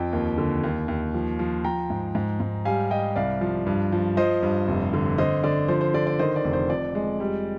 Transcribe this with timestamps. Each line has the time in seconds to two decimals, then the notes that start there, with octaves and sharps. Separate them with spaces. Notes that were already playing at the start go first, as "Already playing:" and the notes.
Already playing: F2 G5
0.13 D#2
0.38 D3
0.64 D#2
0.88 D#2
1.14 F3
1.39 F3
1.64 F3 G5 A#5
1.90 G#2
2.15 G#2
2.40 G#2
2.65 G3 F5 G#5
2.90 G3 D#5 G5
3.16 C2 D5 F5
3.41 F3
3.66 G2
3.92 F3
4.17 F3 C5 D#5
4.43 G2
4.68 F1
4.93 D3
5.18 D3 C5 D#5
5.44 D3 D5
5.68 F3 C5
5.81 C5
5.94 D3 D5
6.07 D5
6.19 D#3 C5 D#5
6.36 D5
6.44 F1
6.53 C5
6.70 F2 D5
6.95 G#3
7.20 G3